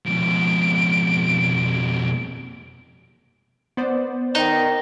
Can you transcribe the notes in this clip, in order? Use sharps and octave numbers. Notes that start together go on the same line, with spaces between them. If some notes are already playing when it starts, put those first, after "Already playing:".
F2 B2 D7
B3 C5 D5
D#3 D#4